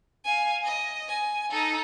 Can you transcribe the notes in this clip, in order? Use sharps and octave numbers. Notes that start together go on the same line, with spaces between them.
F5 G#5
D#5
G#5
D#4 A4